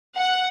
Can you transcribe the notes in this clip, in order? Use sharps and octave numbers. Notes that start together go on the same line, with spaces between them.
F#5